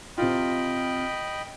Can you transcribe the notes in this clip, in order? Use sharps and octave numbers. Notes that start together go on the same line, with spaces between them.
C3 F4 D#5 G5 B5